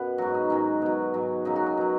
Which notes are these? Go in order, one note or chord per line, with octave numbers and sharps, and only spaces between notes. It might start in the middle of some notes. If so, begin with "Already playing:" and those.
Already playing: F#2 B2 B4 F#5
G#2 F#3 F#4
D#4
G#2 D#3 F#3 C#4
B2 F#3
G#2 F#3
F#2 C#3 F#3 D#4
F#4
D#4
B2 F#3